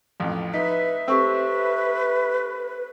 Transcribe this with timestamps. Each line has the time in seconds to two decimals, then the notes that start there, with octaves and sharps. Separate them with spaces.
0.20 A1 F2
0.54 D#4 B4 E5 B6
1.08 A3 C4 G4 B4 C#6 E6